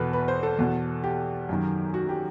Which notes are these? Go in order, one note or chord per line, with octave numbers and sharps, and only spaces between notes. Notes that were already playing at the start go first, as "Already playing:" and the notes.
Already playing: E2 B2 A4 B4
B4
C5
A4
E2 B2
G4
F#2 D#3
F#4
G4